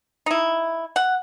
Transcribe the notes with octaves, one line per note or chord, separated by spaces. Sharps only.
D#4 E4
F#5